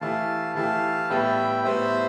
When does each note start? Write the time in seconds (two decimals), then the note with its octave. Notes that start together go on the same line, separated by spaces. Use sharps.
0.01 E3 A3 E4 G4 F5 A5
0.55 E3 A3 E4 G4 F5 A5
1.10 A2 G3 B3 E5 G5
1.64 A2 G3 B3 C5 E5